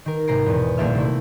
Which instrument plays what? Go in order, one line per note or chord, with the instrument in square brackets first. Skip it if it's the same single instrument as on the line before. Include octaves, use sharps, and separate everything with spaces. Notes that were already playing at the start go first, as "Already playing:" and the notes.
[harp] D#3 A#4
G#1 C3 A#5 A#6 C7 D7
E2 B2
D#1 A#1 A#3 A4 E5 F6
C3 A3 C4 E4